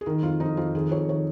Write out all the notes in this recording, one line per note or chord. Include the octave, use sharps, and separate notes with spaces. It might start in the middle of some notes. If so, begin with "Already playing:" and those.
G#4
D#3 A#4
F2 F4
F2 D#4
F2 F4
D#3 G#4
F2 C#5
D#3 C#5